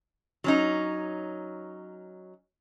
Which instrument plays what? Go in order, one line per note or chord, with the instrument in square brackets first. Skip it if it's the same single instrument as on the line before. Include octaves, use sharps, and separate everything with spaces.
[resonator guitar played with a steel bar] F#3 C#4 D#4